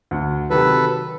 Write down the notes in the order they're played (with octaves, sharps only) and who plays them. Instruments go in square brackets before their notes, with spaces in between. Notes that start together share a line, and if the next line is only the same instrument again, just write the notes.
[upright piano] D2
[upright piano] C3 D#3 F#3 [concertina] A4 B4